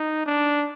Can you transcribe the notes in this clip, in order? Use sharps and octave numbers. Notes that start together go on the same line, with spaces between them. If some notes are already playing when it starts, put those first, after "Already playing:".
Already playing: D#4
D4